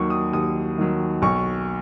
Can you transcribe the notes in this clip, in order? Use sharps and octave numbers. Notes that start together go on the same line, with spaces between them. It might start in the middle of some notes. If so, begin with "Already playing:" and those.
Already playing: D#2 D#3 F#3 C#6
D#6
D#2 D#6
D#3 F#3
B1 C#6